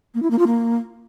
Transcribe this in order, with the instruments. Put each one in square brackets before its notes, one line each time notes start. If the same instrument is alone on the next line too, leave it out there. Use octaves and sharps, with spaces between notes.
[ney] A#3
E4
A#3
F4
A#3